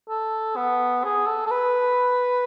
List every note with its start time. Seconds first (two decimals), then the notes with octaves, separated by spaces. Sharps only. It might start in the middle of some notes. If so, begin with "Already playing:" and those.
0.09 A4
0.56 B3
1.04 G#4
1.27 A4
1.47 A4
1.51 B4